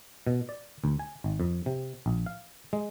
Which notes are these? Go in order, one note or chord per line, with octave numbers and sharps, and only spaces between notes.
B2
D5
D2
G#5
G#1
F2
C3
A#1
F5
G#3